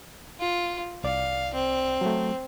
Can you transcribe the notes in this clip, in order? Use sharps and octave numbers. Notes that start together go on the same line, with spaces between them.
F4
C2 D5 F5
C4
F#3 A3